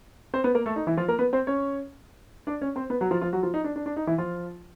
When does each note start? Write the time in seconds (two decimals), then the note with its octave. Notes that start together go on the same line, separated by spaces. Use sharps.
0.34 C4 C5
0.44 B3 B4
0.55 A#3 A#4
0.66 A3 A4
0.76 D#4
0.87 E3 E4
0.97 F3 F4
1.08 A#3 A#4
1.19 B3 B4
1.33 C4 C5
1.47 C#4 C#5
2.47 D4 D5
2.61 C#4 C#5
2.76 C4 C5
2.90 B3 B4
3.01 F#3 F#4
3.11 F3 F4
3.21 F3 F4
3.33 F#3 F#4
3.43 F3 F4
3.54 D#4
3.64 D4
3.76 D4
3.86 D4
3.97 D#4
4.07 E3 E4
4.18 F3 F4